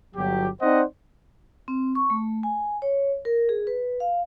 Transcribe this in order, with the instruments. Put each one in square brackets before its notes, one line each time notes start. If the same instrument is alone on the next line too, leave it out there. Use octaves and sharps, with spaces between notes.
[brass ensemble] G1 F#3 G4
C4 D#4 C5 D5 D#5 F#5
[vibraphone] C4
C#6
A3
G#5
C#5
A#4
G#4
B4
F5